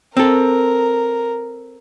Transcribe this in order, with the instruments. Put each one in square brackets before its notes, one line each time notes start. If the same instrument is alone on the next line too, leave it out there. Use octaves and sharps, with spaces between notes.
[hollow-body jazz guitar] C4 A4 [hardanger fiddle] A#4